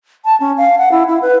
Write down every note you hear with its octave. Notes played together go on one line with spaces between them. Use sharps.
A5
C#4
F5
F#5
E4
E4
B4